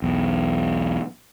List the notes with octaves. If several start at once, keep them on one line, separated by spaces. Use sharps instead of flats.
B1 E2